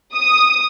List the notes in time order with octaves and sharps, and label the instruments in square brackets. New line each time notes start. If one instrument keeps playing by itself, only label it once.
[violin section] D#6